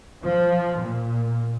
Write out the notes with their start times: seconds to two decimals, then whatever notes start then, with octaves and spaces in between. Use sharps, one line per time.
0.25 F3
0.80 A#2